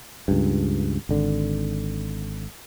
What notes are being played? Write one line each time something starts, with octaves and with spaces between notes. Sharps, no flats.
C#2 G2
G#1 D3